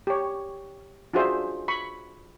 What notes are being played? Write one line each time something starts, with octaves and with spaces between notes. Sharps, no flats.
G4 C#5
D4 F4 F#4 G#4 C5 E5
B5 C#6